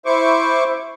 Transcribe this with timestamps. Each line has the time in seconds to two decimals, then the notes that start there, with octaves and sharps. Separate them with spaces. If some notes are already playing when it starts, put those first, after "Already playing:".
0.06 E4 C5 C#6 D6